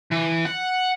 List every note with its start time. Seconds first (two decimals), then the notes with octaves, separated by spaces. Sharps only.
0.11 E3
0.45 F#5